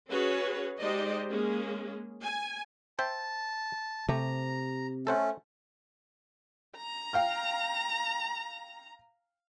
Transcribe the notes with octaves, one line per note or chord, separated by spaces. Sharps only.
C#4 F#4 G#4 B4 C#5
G#3 D#4 G4 C5 D5 D#5
G#3 A#3 C#4 G#4
G#5
C5 E5 G5 A5
C3 A3 G4 A#5
A3 C#4 A4 C5 F#5
A#5
F5 G5 F6